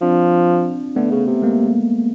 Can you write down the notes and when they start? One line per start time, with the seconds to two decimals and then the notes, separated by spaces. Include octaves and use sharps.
0.01 F3 C4 D4
0.96 D3 A3 B3
1.11 C#3
1.27 C3
1.42 G#3 A#3